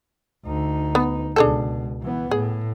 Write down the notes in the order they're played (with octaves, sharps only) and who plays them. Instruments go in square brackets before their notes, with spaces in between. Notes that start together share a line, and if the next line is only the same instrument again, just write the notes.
[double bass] D2 D#4
[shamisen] B3
[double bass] C#2 B2 [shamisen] D4 G#4 A4
[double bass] E3 B3
[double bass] A2 [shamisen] G#4